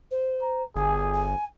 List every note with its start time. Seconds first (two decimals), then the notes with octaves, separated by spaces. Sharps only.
0.11 C5
0.42 A#5
0.76 G1 G#4 G#5
1.13 G#5